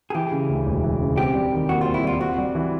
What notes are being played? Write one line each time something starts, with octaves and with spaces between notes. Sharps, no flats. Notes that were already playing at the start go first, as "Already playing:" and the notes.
G#4
E3 G4
C#3
D2
E1
E3
C#3
C4 G4
G3
D#3
D#2 F#4
C4 F4
E4
G3 F4
C4 F#4
G3
E3